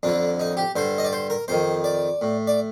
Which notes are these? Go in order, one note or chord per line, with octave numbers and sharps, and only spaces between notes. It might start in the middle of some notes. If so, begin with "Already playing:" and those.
F2 D3 D4
D#4
G4
G2 D3 C5
D#5
D5
C5
A#4
F2 D#3 C5
D5
A2
D5